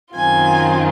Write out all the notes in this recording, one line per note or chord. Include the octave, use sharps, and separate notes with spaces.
F#2 D#3 F#3 C4 F4 G#5